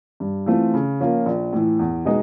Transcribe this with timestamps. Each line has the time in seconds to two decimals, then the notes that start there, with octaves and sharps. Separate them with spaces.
0.20 G2
0.46 E3 A3 C4 F4
0.74 C#3
1.00 F3 A#3 C#4 F4
1.26 A#1
1.53 A2 E3
1.79 E2
2.05 B2 G#3 B3 D#4